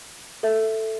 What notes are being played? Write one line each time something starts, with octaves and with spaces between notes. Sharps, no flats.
A4 E5